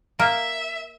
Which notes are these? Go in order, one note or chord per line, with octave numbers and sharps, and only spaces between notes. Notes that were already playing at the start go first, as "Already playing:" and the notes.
A#3 E5